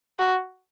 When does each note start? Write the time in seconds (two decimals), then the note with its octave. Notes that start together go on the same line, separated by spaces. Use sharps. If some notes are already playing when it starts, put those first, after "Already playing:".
0.19 F#4